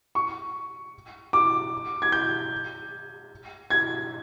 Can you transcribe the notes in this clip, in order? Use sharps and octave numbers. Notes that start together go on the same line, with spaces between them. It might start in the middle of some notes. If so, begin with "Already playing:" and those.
C#6
D6
G#6
G6
G#6